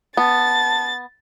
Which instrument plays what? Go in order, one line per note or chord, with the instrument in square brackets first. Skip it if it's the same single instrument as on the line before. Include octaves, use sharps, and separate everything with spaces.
[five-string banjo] B3 [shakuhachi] A5 [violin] A6